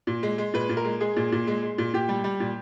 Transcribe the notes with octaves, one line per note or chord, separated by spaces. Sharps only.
A#2
G#3
G#3
A#2 B4
A#2
A#4
G#3
G#3 G#4
A#2
A#2
G#3
G#3
A#2
A#2 G4
G3
G3
A#2